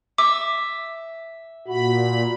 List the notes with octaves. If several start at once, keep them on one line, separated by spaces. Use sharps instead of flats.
E5 D6
A#2 F#4 B5